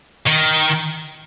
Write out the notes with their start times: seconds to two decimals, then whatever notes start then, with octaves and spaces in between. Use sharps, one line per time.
0.27 D#3